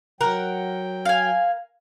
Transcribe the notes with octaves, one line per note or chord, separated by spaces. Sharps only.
F#3 A#4 F#5 G5
F5 G#5